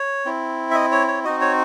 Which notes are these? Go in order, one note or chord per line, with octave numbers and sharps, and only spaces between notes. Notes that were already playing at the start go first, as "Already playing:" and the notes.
Already playing: C#5
C4 E4
E5
D#5
C#5
C#5
C4 D#4 F#4 D#5
C#5